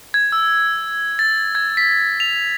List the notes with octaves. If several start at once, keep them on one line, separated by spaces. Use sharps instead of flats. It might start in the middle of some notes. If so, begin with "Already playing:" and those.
G#6
E6
A6
G#6
B6
F7